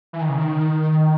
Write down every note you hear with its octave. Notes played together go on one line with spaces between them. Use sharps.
E3
D#3
C#3
D#3